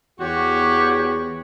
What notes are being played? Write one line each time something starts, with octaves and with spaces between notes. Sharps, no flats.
E2 F#4 G4 C#5